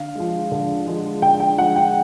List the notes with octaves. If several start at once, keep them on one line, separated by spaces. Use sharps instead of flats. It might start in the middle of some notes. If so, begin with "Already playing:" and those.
Already playing: D3 F5
F3 G#3
D3
F3 G#3
D3 G5
G5
F3 G#3 F#5
G5